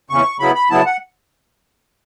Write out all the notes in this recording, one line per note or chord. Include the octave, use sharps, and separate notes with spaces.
E2 C#3 E3 C#4 C#6
C#3 F#3 B3 E4 B5
B5
C#3 F#3 B3 E4 A5
F#5